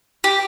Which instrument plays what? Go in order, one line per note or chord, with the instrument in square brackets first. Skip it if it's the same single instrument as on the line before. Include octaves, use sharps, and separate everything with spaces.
[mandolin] G4